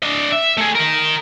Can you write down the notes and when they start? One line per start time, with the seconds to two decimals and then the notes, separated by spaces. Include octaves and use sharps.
0.03 D4 D#5
0.32 E5
0.57 A3 G#4
0.75 A#4 D#5